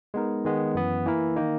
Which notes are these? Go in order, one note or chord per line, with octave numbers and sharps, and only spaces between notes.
G#3 B3 D#4 A#4
D#3 G#3 B3
F#2 E3 B3
E3 A#3 E4 A#4
D#3 A#3 D#4